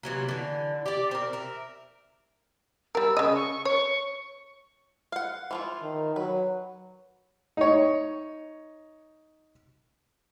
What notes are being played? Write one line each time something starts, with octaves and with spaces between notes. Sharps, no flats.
C3 E3 F#3 A#3
D3 E3
G4 D5
C4 A#4
A#4 E5
G3 A#4 E6
C#3 D#5
C#6
C#5 C#6
F5 F#5
E3 F3 F4
D#3
F#3 B4
D#4 C#5